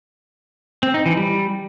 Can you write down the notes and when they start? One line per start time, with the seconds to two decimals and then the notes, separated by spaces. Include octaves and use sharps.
0.83 C4
0.94 D#4
1.06 E3
1.17 G3